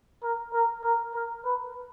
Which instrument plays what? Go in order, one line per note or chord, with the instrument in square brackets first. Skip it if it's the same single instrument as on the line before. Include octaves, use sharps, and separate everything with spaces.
[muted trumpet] A#4
A#4
A#4
A#4
B4